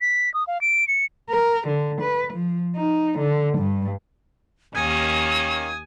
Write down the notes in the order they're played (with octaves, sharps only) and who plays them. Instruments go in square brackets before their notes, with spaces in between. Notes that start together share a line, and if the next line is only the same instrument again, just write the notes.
[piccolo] B6
D#6
F5
D7
C#7
[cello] A#4
D3
B4
F3
D#4
D3
G2
[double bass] D#2 [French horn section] D#3 A#3 C#4 [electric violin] G#5 [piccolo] D#6